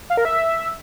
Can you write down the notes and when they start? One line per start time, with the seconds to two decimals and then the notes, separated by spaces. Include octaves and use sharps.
0.10 F5
0.17 A#4
0.25 E5